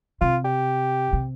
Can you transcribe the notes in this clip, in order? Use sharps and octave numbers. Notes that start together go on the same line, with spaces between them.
C3 F4
G4
C3